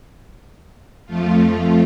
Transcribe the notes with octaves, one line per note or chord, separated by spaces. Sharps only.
F2 F3 A3 F4